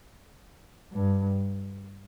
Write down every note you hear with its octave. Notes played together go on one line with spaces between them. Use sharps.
G2